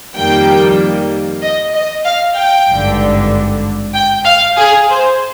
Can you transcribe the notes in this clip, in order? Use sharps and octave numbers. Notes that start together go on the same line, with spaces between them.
F2 D#3 G3 A#3 G5
D#5
D#5
F5
G5
G#1 G2 D3
G5
F5
G#4
C5